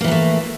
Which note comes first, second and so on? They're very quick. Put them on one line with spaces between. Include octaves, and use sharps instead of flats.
A#3 E3 F#3 A3